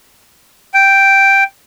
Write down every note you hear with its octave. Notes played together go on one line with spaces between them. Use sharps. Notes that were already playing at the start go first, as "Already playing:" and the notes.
G5